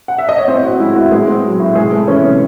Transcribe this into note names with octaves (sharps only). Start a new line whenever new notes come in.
F#5
E5
D#5
C#5
A2 C4 C5
C4 F#4
G#3 E4
A2 F#4
A2 G#3 G#4
C4
F#3
A2
C3 G#3 G#4
G#3 A3 A4
E3 C#4 C#5
C3